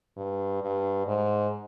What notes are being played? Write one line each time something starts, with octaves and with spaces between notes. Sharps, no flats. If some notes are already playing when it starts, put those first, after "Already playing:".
G2
G2
G#2